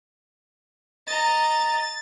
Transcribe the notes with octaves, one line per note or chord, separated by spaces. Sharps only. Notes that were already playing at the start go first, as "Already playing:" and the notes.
D#5 A#5 A6